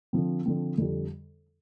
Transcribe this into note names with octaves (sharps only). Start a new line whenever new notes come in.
D3 F3 C4
D3 F3 C4
F2 D3 G3